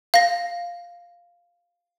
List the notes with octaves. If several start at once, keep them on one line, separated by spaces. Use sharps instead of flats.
F5 A#6